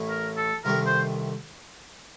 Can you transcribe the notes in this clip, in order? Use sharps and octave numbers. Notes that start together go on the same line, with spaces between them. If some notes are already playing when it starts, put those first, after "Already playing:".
Already playing: A1 A2 A3
A#4
A4
C2 C3 D#3 A3 C4 A#4
C5